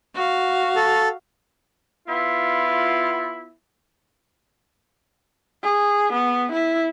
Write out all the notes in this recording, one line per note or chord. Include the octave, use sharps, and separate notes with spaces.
F#4 F5
A4
B3 E4 F4
G#4
B3
E4